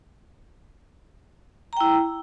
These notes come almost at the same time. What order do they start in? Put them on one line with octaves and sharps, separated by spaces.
A#5 G5 E4